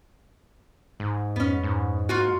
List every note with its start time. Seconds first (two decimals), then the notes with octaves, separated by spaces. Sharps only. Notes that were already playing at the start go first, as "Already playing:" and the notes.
1.00 D1 G#2
1.36 F2 B3 C#4
1.63 G#2
2.09 F#2 A#3 F4 F#4